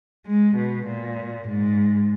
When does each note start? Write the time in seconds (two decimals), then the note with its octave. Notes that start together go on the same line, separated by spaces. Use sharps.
0.26 G#3
0.57 B2
0.88 A#2
1.48 G#2